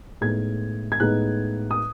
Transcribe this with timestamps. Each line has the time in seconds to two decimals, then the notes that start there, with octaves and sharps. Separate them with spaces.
0.21 A2 G#3 B3 D#4 G#6
0.92 G#6
1.00 A2 G#3 B3 D#4 F#6
1.71 D#6